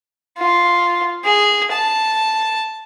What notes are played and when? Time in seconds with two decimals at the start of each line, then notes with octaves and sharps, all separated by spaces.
0.39 F4
1.24 G#4
1.72 A5